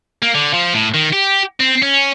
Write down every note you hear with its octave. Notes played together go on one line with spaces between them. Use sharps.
A#3
D3
F3
A2
D#3
G4
C4
C#4